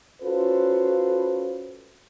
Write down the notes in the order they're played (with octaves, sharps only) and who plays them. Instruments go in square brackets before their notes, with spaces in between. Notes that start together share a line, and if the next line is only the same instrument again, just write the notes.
[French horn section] C#4 F4 F#4 A4 B4 C5